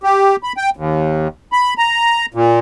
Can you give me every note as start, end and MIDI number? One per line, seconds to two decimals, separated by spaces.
0.03 0.36 67
0.43 0.53 83
0.57 0.70 79
0.77 1.28 39
1.52 1.74 83
1.78 2.26 82
2.34 2.59 46